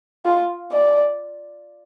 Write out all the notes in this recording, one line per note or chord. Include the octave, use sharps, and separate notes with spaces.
F4
D5